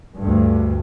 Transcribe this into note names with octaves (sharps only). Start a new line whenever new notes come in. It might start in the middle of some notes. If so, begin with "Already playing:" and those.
D2 G2